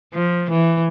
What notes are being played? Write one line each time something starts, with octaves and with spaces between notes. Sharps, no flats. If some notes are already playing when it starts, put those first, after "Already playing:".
F3
E3